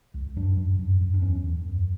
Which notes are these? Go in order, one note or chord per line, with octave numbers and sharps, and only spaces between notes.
C#2
F#2 D4
F#2
F#2
F#2
D4
E2 C#4
E2
F#2